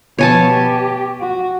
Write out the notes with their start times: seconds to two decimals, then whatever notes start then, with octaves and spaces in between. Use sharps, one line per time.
0.19 B2 F3 C#5 G#5 A5
0.51 G4
1.21 F#4